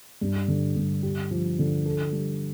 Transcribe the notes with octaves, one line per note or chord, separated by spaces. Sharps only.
G2
D3
G2
G4
F3
D3
A4
G3